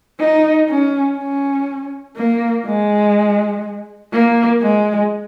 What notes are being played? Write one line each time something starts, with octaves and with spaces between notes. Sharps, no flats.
D#4
C#4
C#4
A#3
G#3
A#3
G#3